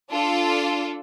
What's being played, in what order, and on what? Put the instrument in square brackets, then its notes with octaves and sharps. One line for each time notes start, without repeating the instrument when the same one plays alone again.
[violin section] D4 F4 A4